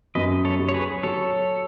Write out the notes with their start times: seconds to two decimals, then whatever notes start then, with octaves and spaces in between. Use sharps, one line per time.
0.15 F#2 B4 D#5
0.45 A4 C#5
0.59 F#3
0.69 C#5
0.74 G#4 B4
1.03 F#3 A4 C#5